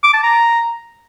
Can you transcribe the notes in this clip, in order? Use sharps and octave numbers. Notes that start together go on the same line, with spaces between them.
D6
A5
A#5